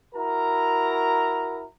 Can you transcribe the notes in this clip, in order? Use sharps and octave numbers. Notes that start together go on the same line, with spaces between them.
E4 F#4 A#4 A#5